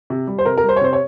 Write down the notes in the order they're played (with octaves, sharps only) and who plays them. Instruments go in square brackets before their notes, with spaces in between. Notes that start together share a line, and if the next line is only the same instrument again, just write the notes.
[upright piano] C3
G3
C5
C3 A#4
A#4
G3
C5
C#5
C3 C5
C#5